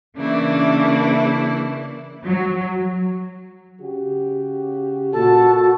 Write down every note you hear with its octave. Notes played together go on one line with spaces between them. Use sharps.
C#3 E3 A#3 D4 E4
F#3
C#3 F#4 G4
A#2 F#4 A4 A5